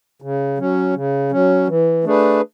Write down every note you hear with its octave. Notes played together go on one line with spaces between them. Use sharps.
C#3
F#3 C#4
C#3
F#3 C#4
E3
A3 D4 G#4 B4